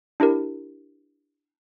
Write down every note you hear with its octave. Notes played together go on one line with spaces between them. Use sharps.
D4 E4 G4 A#4